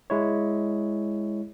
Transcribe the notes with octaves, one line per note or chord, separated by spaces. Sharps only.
G#3 E4 C#5